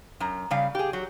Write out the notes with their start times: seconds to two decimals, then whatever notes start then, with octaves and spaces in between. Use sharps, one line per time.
0.20 F#2 A#5
0.51 C#3 G3 F5
0.75 G4 G#4
0.93 F#3